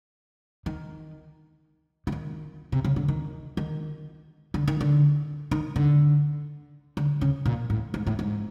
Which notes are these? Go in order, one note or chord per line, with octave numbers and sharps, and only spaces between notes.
D#3
E3
D#3
C3
C#3
D3
D#3
D#3
D3
D#3
D3
D#3
D3
D3
C#3
A#2
A2
G#2
A2
G#2